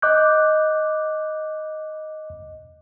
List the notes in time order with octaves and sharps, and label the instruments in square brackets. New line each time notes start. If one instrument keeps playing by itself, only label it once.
[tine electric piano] D#5 D6 F#6 G6